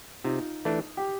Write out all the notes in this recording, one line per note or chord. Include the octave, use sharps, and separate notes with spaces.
C3 D#4 F4
E3 A3 D4
G4